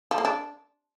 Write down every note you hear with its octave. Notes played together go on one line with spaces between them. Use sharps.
F3
A#3
D4